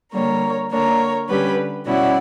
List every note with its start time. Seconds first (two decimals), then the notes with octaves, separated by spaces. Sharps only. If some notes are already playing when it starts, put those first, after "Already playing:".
0.13 D3 G3 A#3 A#4 C#5
0.71 D3 A#3 D4 A#4 C#5
1.29 D3 G3 C#4 G4 B4
1.86 B2 G3 C#4 E4 D5 F#5